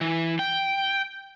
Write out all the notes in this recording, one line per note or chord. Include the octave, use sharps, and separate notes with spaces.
E3
G5